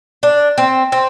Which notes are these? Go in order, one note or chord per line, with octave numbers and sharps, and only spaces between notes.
D4
C4
C4